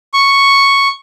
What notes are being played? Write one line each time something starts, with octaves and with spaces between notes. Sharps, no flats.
C#6